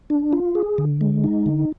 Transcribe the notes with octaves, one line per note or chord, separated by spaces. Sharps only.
D4
F4
G#4
D3
G#3
D#4
D3